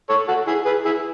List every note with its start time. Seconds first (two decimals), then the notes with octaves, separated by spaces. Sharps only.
0.09 A4 C#5
0.28 F#4 A4
0.47 E4 G#4
0.66 G#4 B4
0.85 E4 G#4